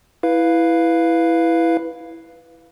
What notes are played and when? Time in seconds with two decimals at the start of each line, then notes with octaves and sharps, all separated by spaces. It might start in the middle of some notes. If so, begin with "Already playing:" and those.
0.23 E4 B4 F5